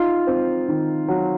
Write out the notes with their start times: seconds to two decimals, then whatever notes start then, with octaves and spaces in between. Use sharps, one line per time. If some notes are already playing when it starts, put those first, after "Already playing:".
Already playing: D#4 F4
0.27 C4
0.68 D#3
1.08 F#3